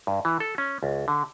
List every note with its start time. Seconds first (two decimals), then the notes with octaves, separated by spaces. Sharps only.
0.07 G2
0.25 E3
0.40 A4
0.58 C#4
0.83 C#2
1.08 D3